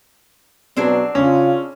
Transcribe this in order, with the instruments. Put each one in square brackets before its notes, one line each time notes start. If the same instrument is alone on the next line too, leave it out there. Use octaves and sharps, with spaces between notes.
[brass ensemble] B2 F#3 [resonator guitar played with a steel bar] C4 D4 G#4
[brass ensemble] C#3 [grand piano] C#4 [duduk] F4